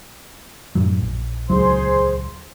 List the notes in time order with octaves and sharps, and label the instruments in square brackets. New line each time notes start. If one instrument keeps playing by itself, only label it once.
[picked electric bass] F#2 A2 F#3
A#1
[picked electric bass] D#1 C#2 F#3 [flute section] G#4 C5 C6